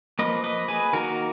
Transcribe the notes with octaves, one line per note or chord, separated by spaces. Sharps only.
F3 A#3 B4 D#5
B4 D#5
G#4 B4
D#3 A#3 F#4 A#4